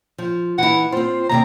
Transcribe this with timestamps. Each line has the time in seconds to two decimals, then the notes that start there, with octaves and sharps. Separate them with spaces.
0.18 F3
0.58 E3 E4 F#5
0.92 C4 F4 C5
1.29 D#2 C3 D5 A#5